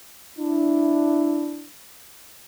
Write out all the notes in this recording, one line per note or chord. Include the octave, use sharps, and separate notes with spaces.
D4 E4